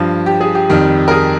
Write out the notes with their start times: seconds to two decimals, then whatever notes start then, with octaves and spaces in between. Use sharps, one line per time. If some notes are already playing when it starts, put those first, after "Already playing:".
Already playing: G2 F3
0.26 G4
0.41 G#4
0.55 G4
0.69 F2 D#3 G3
1.08 A#4
1.11 G#4